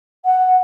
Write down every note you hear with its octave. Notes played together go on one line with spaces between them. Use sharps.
F#5